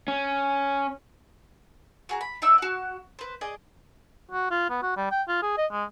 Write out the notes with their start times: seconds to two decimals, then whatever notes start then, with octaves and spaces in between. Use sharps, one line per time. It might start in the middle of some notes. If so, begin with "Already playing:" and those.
0.08 C#4
2.09 F#4 G#4 A#5
2.21 B5
2.42 D#4 D5 E5 E6
2.58 F#4 F#5
3.19 B4 C5
3.41 G#4 D5 D#5
4.31 F#4
4.51 F4
4.70 B3
4.83 F#4
4.97 G3
5.11 G5
5.28 F4
5.42 G#4
5.57 D#5
5.72 G#3